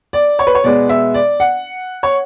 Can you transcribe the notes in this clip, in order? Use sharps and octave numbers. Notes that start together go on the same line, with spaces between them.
D5
C#5
B4
C#5
B2 G#3 B3 D5
E5
D5
F#5
C#5